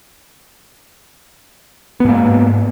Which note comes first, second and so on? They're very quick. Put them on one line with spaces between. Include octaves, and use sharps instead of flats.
B3 G#2 A#3